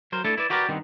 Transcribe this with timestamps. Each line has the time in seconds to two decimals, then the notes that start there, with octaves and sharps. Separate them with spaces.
0.12 F#3 A#4 C5
0.24 A3 D4 E4 A4
0.37 E4 B4 D5
0.50 E4 F#4 G4 A#4 B4 D5
0.69 G2 D#3 B3 C4